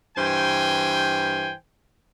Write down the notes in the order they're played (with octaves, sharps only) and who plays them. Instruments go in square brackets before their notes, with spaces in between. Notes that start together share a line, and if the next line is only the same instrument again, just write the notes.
[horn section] G2 E3 C5 G5 G#5